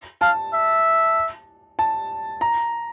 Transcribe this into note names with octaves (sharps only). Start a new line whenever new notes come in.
F5 A5
E5
A5
A#5